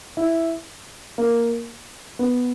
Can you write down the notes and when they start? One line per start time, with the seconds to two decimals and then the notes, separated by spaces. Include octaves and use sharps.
0.17 E4
1.18 A#3
2.19 B3